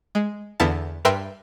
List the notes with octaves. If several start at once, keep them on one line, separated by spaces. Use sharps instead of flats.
G#3
E2 D3 B3 E4 F5 A5
G2 A#4 B4 E5 G5 C6